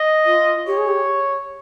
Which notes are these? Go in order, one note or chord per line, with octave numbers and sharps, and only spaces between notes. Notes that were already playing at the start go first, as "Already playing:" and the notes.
Already playing: D#5
F4
G4 C#5
G#4
G4